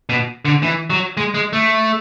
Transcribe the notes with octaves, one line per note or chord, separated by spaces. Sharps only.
B2
D3
E3
F#3
G#3
G#3
A3